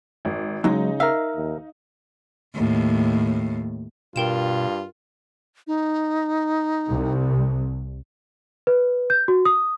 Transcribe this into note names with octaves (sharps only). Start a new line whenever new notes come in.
G#1
C#3 F#3 G#3 D#4
A#4 E5 F5
D#2
D#2 A2
G2 B2 F4 A#4 G5 E7
D#4
C2
B4
G6
F#4
D#6